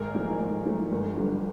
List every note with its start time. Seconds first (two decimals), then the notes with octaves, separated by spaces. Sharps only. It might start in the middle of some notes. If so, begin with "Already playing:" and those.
Already playing: G#1 G#4 A#4
0.15 G#2 F3 A3
0.40 G#1
0.65 G#2 F3 A3
0.92 G1
1.17 G2 D3 F3